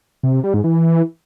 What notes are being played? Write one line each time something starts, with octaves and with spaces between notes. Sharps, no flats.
C3
C3
G3
G#2
E3